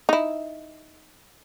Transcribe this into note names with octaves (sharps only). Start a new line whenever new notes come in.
D#4 E4